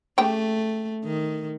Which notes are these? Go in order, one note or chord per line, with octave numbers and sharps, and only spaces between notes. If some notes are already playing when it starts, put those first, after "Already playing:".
C#3 A3 G4 G5
D#3